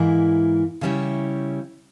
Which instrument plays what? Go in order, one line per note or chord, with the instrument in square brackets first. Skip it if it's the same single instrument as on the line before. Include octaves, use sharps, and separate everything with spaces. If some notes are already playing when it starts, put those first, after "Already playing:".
Already playing: [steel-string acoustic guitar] G#2 E3 A#3 E4
C#3 G3 C#4 E4 G4